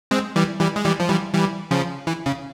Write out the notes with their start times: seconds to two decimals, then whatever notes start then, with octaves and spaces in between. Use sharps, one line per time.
0.11 G#3 C4
0.36 E3 G3
0.60 E3 G3
0.76 G#3
0.85 E3 G3
1.00 F3
1.09 E3 G3
1.34 E3 G3
1.71 C#3 F3
2.07 E3
2.26 C#3